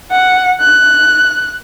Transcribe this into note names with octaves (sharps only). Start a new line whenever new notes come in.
F#5
F#6